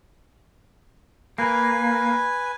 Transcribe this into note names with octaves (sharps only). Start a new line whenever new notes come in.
A#3 B4 G#5